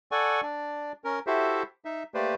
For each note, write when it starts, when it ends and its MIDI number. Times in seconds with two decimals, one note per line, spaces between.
0.12 0.41 69
0.12 0.41 74
0.12 0.41 78
0.12 0.41 80
0.12 0.41 85
0.42 0.92 62
0.42 0.92 74
1.04 1.19 61
1.04 1.19 70
1.27 1.63 64
1.27 1.63 66
1.27 1.63 67
1.27 1.63 69
1.27 1.63 72
1.27 1.63 76
1.85 2.03 63
1.85 2.03 76
2.14 2.35 57
2.14 2.35 58
2.14 2.35 67
2.14 2.35 71
2.14 2.35 72
2.14 2.35 74